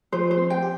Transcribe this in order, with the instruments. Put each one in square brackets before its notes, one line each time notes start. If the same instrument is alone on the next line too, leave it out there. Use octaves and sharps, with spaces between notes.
[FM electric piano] F3 [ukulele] C5
[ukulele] C5
[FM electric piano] C4
[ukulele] G5
[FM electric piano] G4